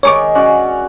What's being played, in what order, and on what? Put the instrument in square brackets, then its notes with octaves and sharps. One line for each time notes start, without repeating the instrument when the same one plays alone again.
[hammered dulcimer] D#3 G#3 A#4 [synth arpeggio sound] C#5 C#6 D6
[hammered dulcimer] C#4 F#4 D5